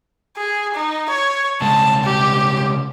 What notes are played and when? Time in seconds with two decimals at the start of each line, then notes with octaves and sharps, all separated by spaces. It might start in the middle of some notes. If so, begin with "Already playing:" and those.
0.38 G#4
0.74 D#4
1.10 C#5
1.62 C#3 G3 G#3 A5
2.05 G4